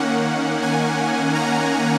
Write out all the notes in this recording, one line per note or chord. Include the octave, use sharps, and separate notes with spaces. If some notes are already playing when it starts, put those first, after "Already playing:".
Already playing: D#3 A#3 C#4 F#5
G#5
A#5